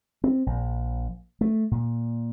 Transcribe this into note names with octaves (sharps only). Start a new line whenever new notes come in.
C4
A#1
A3
A#2